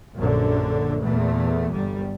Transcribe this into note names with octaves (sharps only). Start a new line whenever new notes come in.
A#1 F#2 D3
E2 A#2 E3 A3
G1 G3